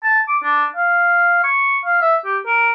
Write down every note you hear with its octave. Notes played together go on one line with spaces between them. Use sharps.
A5
D6
D4
F5
C#6
F5
E5
G4
A#4